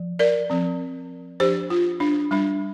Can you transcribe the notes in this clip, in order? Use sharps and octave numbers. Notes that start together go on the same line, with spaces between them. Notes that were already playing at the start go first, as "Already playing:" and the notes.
Already playing: F3
A#4 D5
F3 C4
F3 D4 G4 C5
F4
D4
G3 D4